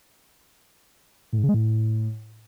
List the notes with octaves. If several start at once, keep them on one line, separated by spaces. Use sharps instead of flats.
A2
G#2
C#3
G#3
A2